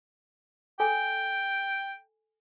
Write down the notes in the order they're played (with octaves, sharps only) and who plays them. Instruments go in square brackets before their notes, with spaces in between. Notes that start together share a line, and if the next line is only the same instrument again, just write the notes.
[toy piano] A4 G#5 [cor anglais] G5